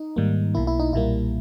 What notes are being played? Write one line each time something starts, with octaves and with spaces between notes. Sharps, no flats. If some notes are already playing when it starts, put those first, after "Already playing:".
Already playing: D#4
G#2 D#3 G3 A#3
B1 B2 A#3 E4
E4
D#4
B1 A#2 G3 A#3 E4